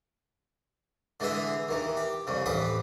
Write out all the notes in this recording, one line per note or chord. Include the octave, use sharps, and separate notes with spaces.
D3 E3 G#3 G#4 E5
D#2 D#3 E3
G4
C2 F2 C#3
A1 F2 G4 B4 D#6